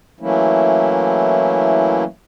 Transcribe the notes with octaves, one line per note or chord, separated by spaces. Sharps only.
E3 F#3 A3 A#3 C#4 E4